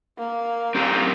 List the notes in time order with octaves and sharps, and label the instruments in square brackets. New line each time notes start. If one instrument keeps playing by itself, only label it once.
[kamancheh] A#3
[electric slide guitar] C4 G4 A#4